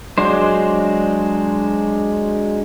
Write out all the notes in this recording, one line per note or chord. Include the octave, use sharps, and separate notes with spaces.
F#3 G#3 D4 C5